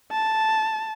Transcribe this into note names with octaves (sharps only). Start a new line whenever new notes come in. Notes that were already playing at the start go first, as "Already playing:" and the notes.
A5